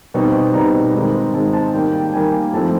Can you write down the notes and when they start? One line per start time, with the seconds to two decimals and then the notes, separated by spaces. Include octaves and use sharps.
0.14 B2 G3 C4 D#4
0.54 B2 G3 C4 D#4 A#5
0.94 G#2 D#3 G#3 C4
1.34 G#2 D#3 G#3 C4 A5
1.54 A5
1.73 D#3 G3 A#3 G5
1.93 G5
2.14 D#3 G3 A#3 G#5
2.52 G#2 F3 A3 C4 E4 A5